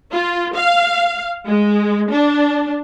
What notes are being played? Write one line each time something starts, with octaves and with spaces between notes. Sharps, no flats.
F4
F5
G#3
D4